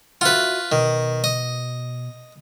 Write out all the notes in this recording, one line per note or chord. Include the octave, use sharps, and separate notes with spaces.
F4 F#4 B4 E5 F#5
B2 D#3
D#5